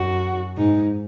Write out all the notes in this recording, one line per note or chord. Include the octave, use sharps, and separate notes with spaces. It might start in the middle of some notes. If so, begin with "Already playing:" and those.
Already playing: F#2 F#4
G#2 D#4